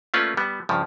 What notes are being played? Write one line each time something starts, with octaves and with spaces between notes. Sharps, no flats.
A3 A#3 C#4 F4 B4 D5
G3 B3
G2 C#3 F3